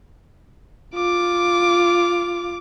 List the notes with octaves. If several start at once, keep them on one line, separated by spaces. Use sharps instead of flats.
F4 D6